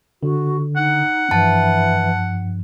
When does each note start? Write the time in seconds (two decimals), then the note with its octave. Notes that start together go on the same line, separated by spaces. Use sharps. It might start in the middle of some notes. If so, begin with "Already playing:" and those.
0.23 D3 F#4
0.76 D#4 F#5
1.31 G2 E3 F3 A5